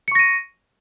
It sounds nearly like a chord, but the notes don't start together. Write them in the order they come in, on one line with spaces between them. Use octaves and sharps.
C#7 C#6 A#6 D#7